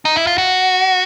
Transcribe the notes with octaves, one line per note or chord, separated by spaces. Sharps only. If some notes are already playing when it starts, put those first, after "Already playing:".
D#4
E4
F4
F#4